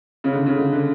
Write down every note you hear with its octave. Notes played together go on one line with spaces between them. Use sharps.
C#3
D3
C#3
D3
D3